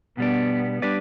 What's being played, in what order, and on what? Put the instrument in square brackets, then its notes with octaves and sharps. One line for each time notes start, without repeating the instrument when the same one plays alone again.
[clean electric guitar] B2 G3 D4 [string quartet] B3
[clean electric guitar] G3 D4 G4 B4 D5